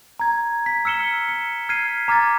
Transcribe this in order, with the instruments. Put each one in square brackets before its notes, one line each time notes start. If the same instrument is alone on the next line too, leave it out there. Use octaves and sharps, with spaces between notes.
[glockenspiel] A#5 G#6
B6
E6 F6 C#7 E7 G7
C#7
F6 G#6 B6 C7 D#7
A#5 D6 F6 G#6 A6